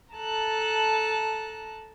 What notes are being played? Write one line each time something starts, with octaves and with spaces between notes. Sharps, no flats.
A4 A5 A#5 F#6